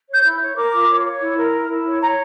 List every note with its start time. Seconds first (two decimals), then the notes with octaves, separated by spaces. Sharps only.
0.08 C#5
0.14 G6
0.24 E4
0.40 C#5
0.56 A#4 D6
0.73 F4
0.89 C#5
1.05 C#5
1.21 E4
1.37 A#4
1.54 E4
1.70 E4
1.86 C#5
2.02 C#5 A#5